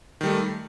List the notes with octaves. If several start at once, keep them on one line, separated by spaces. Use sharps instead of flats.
D#3 G3 A3